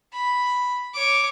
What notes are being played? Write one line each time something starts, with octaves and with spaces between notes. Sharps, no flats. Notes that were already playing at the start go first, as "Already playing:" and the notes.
B5
C#5 D6